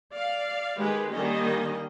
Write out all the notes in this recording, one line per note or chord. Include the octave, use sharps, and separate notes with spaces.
D5 F5
D#3 G#3 G4 B4
D#3 G3 A#3 C#4 D5 D#5